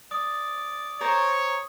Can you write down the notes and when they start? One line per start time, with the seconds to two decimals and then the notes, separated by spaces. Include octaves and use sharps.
0.11 D5 D#6
1.01 A#4 C5 C#5